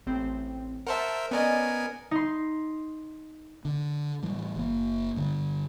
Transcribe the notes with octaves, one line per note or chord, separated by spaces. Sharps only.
A1 C4
A#4 C5 E5 F#5 A5
B3 C#4 A#4 D5 D#5 G#5
D#4 C6
D3
A2 E3 G3
F#1 A#3
G2 D3